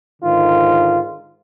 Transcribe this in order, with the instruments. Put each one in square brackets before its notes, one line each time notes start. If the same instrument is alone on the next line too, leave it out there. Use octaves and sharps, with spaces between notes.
[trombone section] G#2 D3 D#3 F4